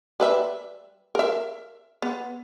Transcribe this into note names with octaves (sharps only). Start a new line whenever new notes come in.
G3 B4 E5
A#4 E5
B3